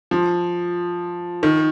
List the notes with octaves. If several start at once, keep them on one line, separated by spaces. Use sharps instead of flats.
F3
D#3